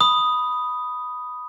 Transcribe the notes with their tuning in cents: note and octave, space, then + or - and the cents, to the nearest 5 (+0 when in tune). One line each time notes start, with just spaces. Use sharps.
B5 +0 D#6 +0